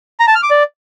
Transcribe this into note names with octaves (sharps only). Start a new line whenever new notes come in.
A#5
A5
F6
D6
D5